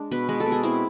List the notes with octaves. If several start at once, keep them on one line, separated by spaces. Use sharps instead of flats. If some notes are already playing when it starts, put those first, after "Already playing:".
Already playing: G#3 D4
B2 B4
G#3 B4
A4
B2
G#4
C4 E4